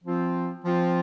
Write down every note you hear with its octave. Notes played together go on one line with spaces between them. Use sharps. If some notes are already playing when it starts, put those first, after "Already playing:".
F3 C4 F4
F3 C4 F4